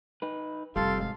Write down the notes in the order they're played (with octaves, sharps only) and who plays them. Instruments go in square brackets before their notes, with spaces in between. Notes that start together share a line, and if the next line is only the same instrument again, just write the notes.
[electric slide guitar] D#4 B4
[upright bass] F1 F4 [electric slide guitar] G3 [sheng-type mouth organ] A4 F5 C6
[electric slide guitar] G#2 [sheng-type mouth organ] F5